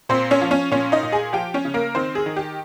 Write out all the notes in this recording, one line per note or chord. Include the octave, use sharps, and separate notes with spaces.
A#2 C4 C5
C#4 C#5
F3
C#4 C#5
A#2 C#4 C#5
D#4 D#5
A#2
G#4 G#5
F3 G4 G5
C#4 C#5
C#3
A#3 A#4
D#3 C4 C5
G#4
D#3
G4